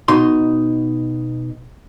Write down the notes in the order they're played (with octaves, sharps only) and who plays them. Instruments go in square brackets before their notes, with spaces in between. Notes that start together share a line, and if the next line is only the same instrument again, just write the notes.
[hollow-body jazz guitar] B2 D#4 C6